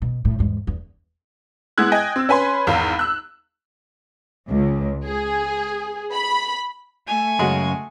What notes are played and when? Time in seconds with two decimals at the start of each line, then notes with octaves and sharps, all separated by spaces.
0.02 B2
0.25 A2
0.39 E2 G#2
0.67 E2
1.78 G#3 B3 E4 F#6 G#6
1.92 D#5 G5 G#5
2.16 C4 E6
2.29 C#4 B4 G#5 B5 C6
2.67 G#1 E2 F5 B5
2.99 E6 F#6
4.49 C#2
5.06 G#4
6.13 B5
7.07 A3 G#5
7.39 F#2 C#3 G#3 F#4